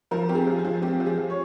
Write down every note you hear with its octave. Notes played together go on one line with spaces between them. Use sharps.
F3 A#4
C4 G4
G#4
F3
G#4
F3
C4 G4
F3
G#4
F3
C#5